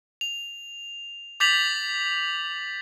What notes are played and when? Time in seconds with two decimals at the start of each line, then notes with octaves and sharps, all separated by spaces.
0.21 F7
1.40 D6 G6 A6 B6 F7 F#7